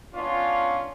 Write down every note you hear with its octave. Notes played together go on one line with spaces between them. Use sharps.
B3 C#4 D4 F4